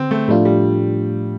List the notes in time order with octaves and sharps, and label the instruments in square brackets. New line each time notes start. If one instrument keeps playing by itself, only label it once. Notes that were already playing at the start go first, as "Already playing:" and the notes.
Already playing: [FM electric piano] D3 [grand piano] C4
[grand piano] A3
[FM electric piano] A2 F3 A3 D4 F4 [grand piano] G3
[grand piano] G3